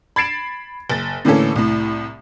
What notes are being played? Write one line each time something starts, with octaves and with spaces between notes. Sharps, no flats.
B5 G#6 A6 C7 D7 E7
F#1 A6
A2 D3 E3 A#3 C#4 A4
C2 A2